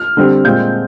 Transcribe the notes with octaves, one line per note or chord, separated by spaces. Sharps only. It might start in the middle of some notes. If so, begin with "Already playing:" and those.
Already playing: F6
D3 G3 C4
A#2 G#3 C4 G6